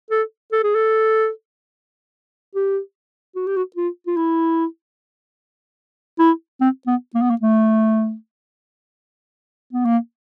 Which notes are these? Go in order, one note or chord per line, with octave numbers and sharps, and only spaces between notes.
A4
A4
G#4
A4
G4
F#4
G4
F#4
F4
F4
E4
E4
C4
B3
A#3
B3
A#3
A3
B3
A#3